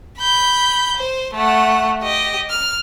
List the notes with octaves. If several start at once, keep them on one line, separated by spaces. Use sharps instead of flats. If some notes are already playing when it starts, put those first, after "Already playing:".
B5 G6
C5
A3 F#5
G4 D#5
F6